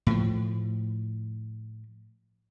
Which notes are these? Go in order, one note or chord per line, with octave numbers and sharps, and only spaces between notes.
A2 F3